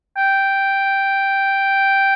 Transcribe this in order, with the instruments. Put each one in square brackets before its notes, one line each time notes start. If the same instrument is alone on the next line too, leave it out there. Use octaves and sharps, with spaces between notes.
[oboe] G5